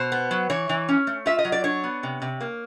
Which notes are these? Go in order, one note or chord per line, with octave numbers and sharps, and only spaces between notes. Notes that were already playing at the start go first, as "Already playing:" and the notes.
Already playing: B2 C5
B3
F#3
E3 C#5
E3
C#4
A3
F4 E5
D#5
F#3
D5
D4 C#5
B3
C3
C3
A#3